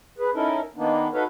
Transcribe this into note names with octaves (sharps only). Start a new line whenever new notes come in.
G#4 B4
C#4 D#4 E4 A4 A#4
D#3 A#3 B3 D4 D#4
D#4 F#4 A4 B4 C#5 F5